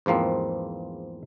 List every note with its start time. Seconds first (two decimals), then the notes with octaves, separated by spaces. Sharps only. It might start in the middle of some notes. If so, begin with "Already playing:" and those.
0.06 E2 G#2 F3 A#3 C4